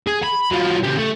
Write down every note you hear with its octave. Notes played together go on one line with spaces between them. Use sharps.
G#4
B5
F#3 F4
C#3 G4
A3